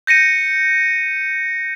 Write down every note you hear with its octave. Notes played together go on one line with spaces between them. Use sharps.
G6 A#6 C#7 D#7